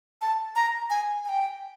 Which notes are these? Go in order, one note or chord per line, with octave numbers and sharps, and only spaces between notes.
A5
A#5
G#5
G#5
G5